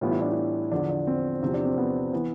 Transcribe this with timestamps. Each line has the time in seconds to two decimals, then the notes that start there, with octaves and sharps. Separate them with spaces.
0.01 A2 E3 G3 B3 F4
0.11 E4
0.21 D4
0.31 E4
0.72 E2 D3 F3 D4
0.89 D4
1.07 C4
1.42 E2 C3 F3 C4
1.54 D4
1.65 C4
1.78 B3
2.13 E3 B3